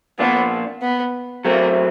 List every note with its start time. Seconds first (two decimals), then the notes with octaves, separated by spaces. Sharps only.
0.19 A#2 F3 A#3 B3 D4 F4
0.82 B3
1.45 F#3 A3 A#3 C4